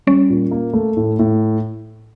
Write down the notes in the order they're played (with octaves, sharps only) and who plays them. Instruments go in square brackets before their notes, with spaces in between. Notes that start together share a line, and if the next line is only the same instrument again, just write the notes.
[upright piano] G3 [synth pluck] C#4
[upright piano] A#2
A#3
A3
A2
A2